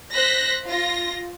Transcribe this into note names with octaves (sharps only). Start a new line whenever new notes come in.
C5 F#6 A#6 B6
F4 A#6